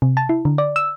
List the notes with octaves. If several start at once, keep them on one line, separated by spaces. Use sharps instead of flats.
C3
A5
E4
D3
D5
E6